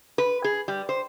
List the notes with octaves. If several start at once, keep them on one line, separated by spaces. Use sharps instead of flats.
B4
G#4
G3
C5